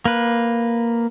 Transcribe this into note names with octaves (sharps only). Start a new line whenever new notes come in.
A#3 B4